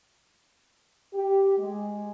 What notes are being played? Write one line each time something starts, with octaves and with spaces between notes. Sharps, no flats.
G4
G#3